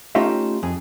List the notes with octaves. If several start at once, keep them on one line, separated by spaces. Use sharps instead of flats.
A3 C#4 D#4 F4 G4 E5
F2 G#4